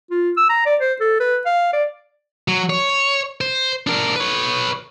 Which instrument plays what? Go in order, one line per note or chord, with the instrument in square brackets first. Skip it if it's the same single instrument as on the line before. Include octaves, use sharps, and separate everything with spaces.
[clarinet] F4
E6
A#5
D5
C5
A4
B4
F5
D5
[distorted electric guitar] F#3
C#5
C5
D4 A#4
B4 C#5